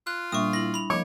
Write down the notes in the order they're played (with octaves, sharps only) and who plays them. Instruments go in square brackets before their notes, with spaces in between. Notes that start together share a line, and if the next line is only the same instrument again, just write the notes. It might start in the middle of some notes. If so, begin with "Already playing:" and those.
[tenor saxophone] F4 [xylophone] F#6
[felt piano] A#2 [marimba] G3 D4 E5 [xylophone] C#6 D#6
[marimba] E4 [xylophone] A#6 F#7
[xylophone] B5 F7
[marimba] F3 [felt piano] A#3 D#5 D6 [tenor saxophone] C#5